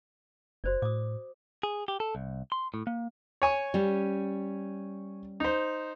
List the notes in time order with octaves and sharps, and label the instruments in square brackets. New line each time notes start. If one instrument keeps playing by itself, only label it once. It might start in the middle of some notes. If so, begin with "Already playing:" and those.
[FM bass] F#1 [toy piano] F#4 C5 D5
[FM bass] A2 [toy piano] D6 D#6
[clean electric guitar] G#4
G4
A4
C2
C6
A2
A#3
[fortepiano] C#5 G#5 C#6
[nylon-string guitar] G3 C#4
[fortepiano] D#4 C5